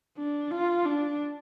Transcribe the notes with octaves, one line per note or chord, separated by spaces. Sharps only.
D4
F4
D4